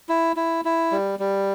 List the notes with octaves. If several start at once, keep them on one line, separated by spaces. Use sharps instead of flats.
E4
E4
E4
G3
G3